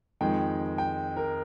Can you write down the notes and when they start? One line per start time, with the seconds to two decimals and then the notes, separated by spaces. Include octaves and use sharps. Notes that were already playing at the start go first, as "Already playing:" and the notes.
0.21 F2 D#3 G#3 G5
0.78 G5
1.16 A#4